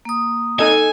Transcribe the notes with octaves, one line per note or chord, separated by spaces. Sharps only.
A#3 D#6
D#4 A4 D#5 G#5